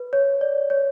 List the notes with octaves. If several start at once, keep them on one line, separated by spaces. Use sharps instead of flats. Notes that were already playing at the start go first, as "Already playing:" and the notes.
Already playing: B4
C#5
D5
C#5